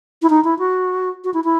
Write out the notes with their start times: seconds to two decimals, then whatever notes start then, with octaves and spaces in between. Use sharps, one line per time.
0.22 E4
0.30 D#4
0.44 E4
0.59 F#4
1.24 F#4
1.34 E4
1.44 E4